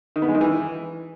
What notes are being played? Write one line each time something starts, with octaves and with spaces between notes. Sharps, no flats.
D#3
B3
G#3
D#3
E3